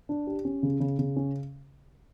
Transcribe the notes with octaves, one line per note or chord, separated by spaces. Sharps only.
D4
G4
C#4
C#3
C#3
C#3
C#4